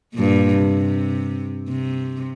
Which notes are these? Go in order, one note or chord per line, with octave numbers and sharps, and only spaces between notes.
G2 A#2
C3
C3